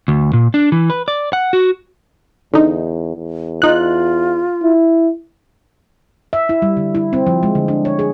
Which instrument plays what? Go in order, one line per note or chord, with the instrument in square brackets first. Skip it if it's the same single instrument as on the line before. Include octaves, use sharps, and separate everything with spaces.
[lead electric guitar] D2
A#2
D4
E3
B4
D5
F#5
F#4
[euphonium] E2 [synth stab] D3 D#4
[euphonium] E2
[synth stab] D#4 F#6 [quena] F4
[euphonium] E4
[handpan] E5
E4
G3
D3
E4
C4
F3
G#3
D3
D4
C#5
G#4